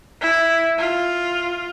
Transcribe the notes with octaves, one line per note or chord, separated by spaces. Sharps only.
E4
F4